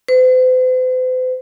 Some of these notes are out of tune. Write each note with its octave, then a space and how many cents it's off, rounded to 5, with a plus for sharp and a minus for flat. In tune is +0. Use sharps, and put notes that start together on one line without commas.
C5 -45